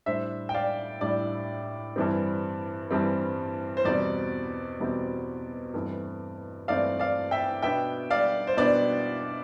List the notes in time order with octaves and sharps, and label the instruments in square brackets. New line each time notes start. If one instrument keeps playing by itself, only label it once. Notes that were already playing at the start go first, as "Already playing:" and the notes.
[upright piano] A2 G3 D4 C5 E5
G5
D5 F5
A2 G3 D4 D5
G2 E3 G3 C4
G2 E3 G3 C4
C5
E2 B2 G3 C4 D5
E2 B2 G3 C4
G2 E3 A3 C4
G2 E3 A3 C4 D5 F5
D5 F5
E5 G5
B2 B3 D4 E5 G5
D5 F5
C5
B2 B3 D4 D5